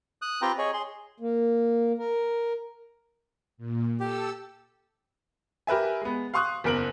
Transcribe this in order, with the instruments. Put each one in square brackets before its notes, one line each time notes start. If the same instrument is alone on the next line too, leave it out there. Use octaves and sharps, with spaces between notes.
[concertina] D#6 F#6
C4 F4 G4 B4 G5 A#5
G#4 C#5 D#5
G#4 C6
[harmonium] A#3
A#4
[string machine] A#2
[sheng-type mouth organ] G4 [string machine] A4 E6
[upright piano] G4 A#4 B4 E5 G#5
G#3 B3
F5 C6 C#6 D#6 F#6
F#1 E2 A#4 D7 F#7